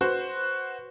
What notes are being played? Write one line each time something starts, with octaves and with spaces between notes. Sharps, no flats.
F#4 B4 C5